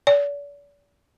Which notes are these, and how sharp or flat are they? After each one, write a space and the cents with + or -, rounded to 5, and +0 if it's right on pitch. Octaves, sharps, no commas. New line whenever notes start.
D5 -40